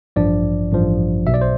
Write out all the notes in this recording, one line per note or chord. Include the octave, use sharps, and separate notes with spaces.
A1 G2 F3 D4 D5
A1 G2 F3
B1 B2 E5
D5
C5